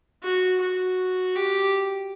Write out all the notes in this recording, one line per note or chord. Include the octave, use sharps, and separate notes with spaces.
F#4
F#4
G4